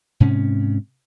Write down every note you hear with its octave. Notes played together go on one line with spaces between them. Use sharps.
G#2 C3 C#4